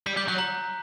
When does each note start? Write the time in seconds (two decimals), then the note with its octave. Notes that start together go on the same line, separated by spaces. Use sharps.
0.06 G3 B6
0.17 G3 G6
0.28 F#3 F#6
0.38 A#5